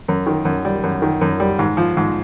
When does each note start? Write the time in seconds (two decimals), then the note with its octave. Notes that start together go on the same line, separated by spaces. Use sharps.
0.08 F#2
0.26 D#3
0.45 F#2
0.65 G3
0.83 F#2
1.02 D#3
1.21 F#2
1.40 G3
1.59 G#2
1.77 F3
1.97 G#2